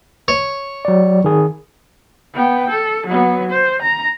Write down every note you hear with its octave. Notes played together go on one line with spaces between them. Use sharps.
C#5
F#3 D5
D#3 G#4
B3 G5
A4
F#3 B3
C5
A#5